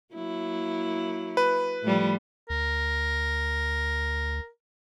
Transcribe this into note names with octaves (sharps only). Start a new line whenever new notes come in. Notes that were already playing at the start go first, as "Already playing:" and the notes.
F#3 A#3 E4
B4
A2 F3 G3
D2 A#4